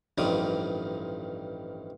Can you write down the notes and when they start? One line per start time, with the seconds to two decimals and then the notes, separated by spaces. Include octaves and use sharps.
0.18 A1 G2 D#3 F3 D5 D#6